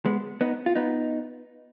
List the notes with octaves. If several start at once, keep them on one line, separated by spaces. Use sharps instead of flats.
G#3 B3
B3 D#4
F4
B3 D#4